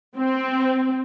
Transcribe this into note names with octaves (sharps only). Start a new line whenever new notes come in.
C4